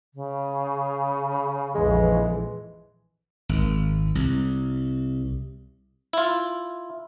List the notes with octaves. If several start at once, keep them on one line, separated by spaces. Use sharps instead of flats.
C#3
A#1 F2 E3 G#3
G#1
C2
E4 F4